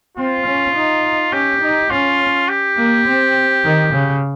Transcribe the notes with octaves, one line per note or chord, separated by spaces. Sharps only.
C4 F4
C#4
D#4
C#4 G4
D#4
C#4 F4
G4
A#3
C4
D#3
C#3